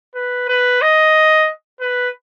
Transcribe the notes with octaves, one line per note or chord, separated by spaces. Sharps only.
B4
B4
D#5
B4